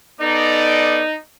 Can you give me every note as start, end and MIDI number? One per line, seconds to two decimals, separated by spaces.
0.21 1.03 59
0.21 1.14 63
0.21 1.03 69
0.21 1.03 74